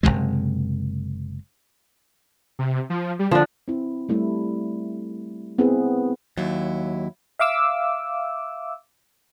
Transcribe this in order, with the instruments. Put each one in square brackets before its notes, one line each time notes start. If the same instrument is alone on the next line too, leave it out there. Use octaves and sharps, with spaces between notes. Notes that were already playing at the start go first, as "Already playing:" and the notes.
[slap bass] F#1 D#2 C3 G#3
[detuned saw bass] C3
F3
G3
[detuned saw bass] D3 [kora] F3 D4
[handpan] C4 E4
G3 A3 E4
B3 C4 E4 G#4 B4
[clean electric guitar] D#2 [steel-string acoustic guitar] F#3 E4
[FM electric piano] E5 F5 D6 E6